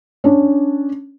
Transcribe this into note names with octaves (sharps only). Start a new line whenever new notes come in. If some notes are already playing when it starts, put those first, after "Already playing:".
C#4 D4